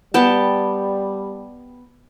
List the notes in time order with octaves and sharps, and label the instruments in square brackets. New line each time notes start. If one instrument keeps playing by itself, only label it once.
[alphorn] G3 [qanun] B3 G5 A5